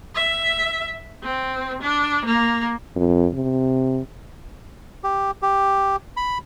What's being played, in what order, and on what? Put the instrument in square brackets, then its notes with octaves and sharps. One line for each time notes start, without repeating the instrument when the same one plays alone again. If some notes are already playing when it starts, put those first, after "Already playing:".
[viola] E5
C4
D4
A#3
[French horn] F2
C3
[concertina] G4
G4
B5